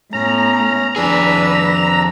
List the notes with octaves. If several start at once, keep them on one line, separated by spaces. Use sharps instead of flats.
A2 B3 C#4 A#5
F2 D4 G#4 B4 E6